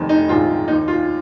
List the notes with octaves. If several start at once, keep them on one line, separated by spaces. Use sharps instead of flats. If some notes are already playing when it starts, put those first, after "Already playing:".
Already playing: F1 F2 D#3
D#4
A#1 G#2 D#3 F4
D#2 D#3 D#4
F4